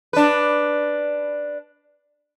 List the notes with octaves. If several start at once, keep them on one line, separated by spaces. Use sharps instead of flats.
D4 B4